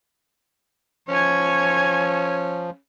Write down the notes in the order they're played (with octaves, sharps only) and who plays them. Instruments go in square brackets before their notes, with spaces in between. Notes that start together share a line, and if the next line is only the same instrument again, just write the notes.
[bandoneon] F3 [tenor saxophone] C#4 [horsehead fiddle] C#5 G#5